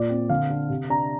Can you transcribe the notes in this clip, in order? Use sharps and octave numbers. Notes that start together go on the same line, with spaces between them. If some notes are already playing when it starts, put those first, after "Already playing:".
Already playing: A#2 D5
C4
D3 F5
D4
C3
D4 A#5